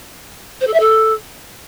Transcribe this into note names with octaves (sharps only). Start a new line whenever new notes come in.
C5
A4
E5
A4